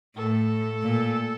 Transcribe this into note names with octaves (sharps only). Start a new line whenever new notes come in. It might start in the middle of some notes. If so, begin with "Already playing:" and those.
A2 A4
A#2